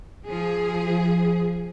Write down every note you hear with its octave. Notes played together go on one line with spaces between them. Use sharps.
F3 G#4